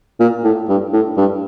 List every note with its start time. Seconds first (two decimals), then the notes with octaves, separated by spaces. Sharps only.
0.20 A#2
0.44 A2
0.69 G2
0.93 A2
1.17 G2